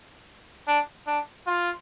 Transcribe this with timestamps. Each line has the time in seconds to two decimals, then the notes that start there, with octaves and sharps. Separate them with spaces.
0.67 D4
1.07 D4
1.47 F4